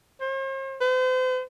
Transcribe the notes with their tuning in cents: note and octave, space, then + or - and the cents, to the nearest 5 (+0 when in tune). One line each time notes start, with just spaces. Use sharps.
C5 +45
C5 -40